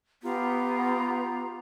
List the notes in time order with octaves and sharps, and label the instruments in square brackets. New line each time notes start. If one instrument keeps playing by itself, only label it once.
[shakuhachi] B3 [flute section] F4 G4 A#5